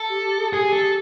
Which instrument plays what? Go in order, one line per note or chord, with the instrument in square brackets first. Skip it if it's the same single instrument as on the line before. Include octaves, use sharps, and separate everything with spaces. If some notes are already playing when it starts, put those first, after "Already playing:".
Already playing: [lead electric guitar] A4
[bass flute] G4
G4
G#4
[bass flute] G4 [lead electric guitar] G#4
[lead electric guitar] A4